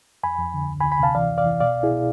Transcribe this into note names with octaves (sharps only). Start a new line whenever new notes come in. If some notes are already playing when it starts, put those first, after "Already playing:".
F2 G#5 B5
F2
D3
D2
G#5 B5
D2
G#5 B5
C3 F5 A5
E3 D5 F5
F2
D5 F5
E3
B2 D5 F5
C2
E4 G#4
B2